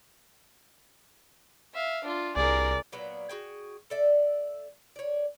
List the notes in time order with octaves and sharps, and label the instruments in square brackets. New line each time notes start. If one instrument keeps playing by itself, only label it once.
[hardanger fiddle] E5 F5
D4 F4
[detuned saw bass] C2 [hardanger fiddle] G#4 A#4 [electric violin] D5
[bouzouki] A#2 F#3 B3 D5
F#4 G#4 G5
A4 D5 E5
C#5 D5